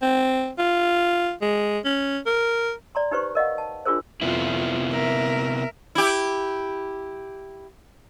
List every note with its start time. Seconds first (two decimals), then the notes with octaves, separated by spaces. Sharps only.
0.02 C4
0.59 F4
1.42 G#3
1.85 C#4
2.26 A#4
2.95 D5 A#5 C6
3.11 D#4 G4 B4 C5 C#6
3.35 A#4 D#5 F5 F#5
3.58 A5
3.85 D4 F4 F#4 G#4 A#4 C5
4.22 F2 C3 B3 E4 F4
4.91 A#4 E5
5.95 E4 G4